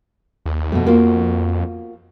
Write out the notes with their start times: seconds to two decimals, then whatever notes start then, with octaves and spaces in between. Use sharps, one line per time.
0.46 D#2
0.72 F2 B2 A3
0.87 A#3 F4 F#4